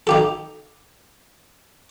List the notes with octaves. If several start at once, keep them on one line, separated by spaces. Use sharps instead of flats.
D#4 G4 A4